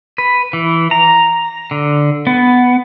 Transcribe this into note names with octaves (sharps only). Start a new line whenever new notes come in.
B4
E3
A#5
D3
B3